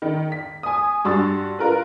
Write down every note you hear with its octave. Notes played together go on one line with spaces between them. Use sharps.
D#3
B6
G#5 D#6
G2 F#4 C6 C#6 E6 A6
F4 A#4 B4